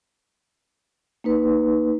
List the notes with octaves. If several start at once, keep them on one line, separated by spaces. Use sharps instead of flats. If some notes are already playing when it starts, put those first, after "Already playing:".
A#3 D#4 B4